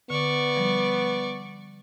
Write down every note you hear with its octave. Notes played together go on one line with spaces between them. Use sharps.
D3 B3 D5 C#6
F3 G3